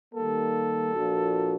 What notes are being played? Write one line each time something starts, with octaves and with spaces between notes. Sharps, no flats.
D#3 G3 A#3 A4
A#2 F3 A#3 D4 F#4